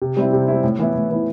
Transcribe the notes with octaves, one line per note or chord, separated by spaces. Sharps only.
C3
G3 C4 E4
C3
G3 C4 E4
A2
E3 B3 E4
A2
E3 B3 E4